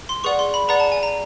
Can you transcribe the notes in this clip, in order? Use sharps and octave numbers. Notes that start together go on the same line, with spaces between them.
C6
G#4 B4 D5 F#5 C#6
C6
B5
G#4 B4 D5 F#5 A#5
A5
G#5
A#5